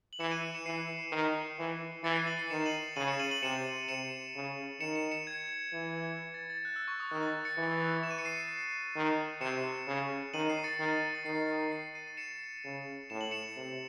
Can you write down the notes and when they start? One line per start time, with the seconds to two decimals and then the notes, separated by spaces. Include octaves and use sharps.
0.13 F#7
0.20 E3 C#7 E7
0.31 D#7 F#7
0.42 C#7 E7
0.54 C#7 E7
0.66 E3 C7 D#7
1.12 D#3
1.59 E3
2.04 E3 A6 C#7
2.16 C7 D#7
2.27 D#7 F#7
2.39 C7 D#7
2.50 D#3 C#7 E7
2.60 E7
2.66 D#7 F#7
2.96 C#3 D#7 F#7
3.08 C#7 E7
3.19 D#7 F#7
3.31 D#7 F#7
3.42 C3 C#7 E7
3.88 C3 C#7 E7
4.35 C#3
4.80 D#3 C#7 E7
4.95 C#7 E7
5.11 C#7 E7
5.27 G#6
5.73 E3
6.34 A6
6.50 A6
6.65 F#6
6.76 E6
6.88 C#6
7.00 D#6
7.11 D#3 F#6
7.22 A6
7.45 A6 C#7
7.57 E3
8.03 E7
8.11 D#7
8.18 C#7
8.25 C7 D#7
8.96 D#3
9.41 C3 C#7 E7
9.87 C#3
10.34 D#3 D#7 F#7
10.49 C7 D#7
10.64 A6 C#7
10.79 D#3
11.15 A6
11.25 D#3 C7
11.72 C7
11.95 C7 D#7
12.07 D#7
12.17 C#7 E7
12.64 C#3
13.10 A2 E7
13.21 F#7
13.31 C#7 E7
13.56 C3